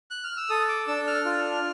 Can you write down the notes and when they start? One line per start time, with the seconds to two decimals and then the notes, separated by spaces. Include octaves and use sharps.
0.11 F#6
0.24 F6
0.37 E6
0.49 A4 D#6
0.69 D6
0.87 D4 E6
1.07 F6
1.25 F4